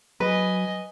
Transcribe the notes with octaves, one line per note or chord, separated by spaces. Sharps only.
F#3 B4 D#5 G#5